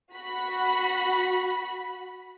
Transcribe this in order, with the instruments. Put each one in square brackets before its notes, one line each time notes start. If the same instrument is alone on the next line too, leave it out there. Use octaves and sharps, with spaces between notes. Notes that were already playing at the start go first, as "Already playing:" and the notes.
[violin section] F#4 B5